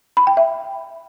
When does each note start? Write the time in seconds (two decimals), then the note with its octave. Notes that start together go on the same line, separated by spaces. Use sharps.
0.17 B5
0.27 G5
0.37 E5